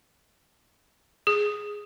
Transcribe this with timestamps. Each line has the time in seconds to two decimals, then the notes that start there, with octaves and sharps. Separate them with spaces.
1.27 G#4